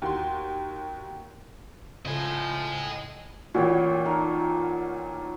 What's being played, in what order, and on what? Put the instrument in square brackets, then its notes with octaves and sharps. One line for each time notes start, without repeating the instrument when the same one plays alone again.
[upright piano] D#2 F#4 G5 C6
[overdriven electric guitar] A2 [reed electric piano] C#3 A4 [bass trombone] F3 [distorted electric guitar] D#5 G#5
[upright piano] A1 A#2 [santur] F#4 C#5 G5
[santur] D#4 A4 A#4